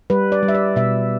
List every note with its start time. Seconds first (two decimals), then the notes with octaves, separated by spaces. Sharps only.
0.10 G3 B4
0.32 D5
0.43 G3
0.48 E5
0.54 D5
0.76 B2 E5